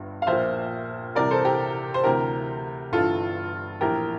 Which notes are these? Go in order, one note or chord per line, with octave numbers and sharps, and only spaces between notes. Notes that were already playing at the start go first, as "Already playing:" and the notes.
Already playing: G1 G2
F5
A#1 A#2 C5 E5
C2 C3 E3 A#4 D5
A4 C5
G4 A#4
C5
D2 C3 E3 G4 A#4
G1 G2 E3 F4 A4
A#1 A2 E3 G4 A#4